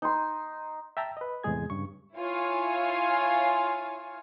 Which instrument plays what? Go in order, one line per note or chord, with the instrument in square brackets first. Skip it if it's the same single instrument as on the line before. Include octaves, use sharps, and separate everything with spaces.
[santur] D#4 C6
[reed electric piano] E5 G5 A5 A#5 E6
B4 D#5
E2 A2 C3 G#3 G#4 G#6
G2 C#3 C#6
[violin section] E4 F4 C#5 F5 G#5